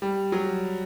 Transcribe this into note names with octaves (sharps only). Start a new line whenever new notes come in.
G3
F#3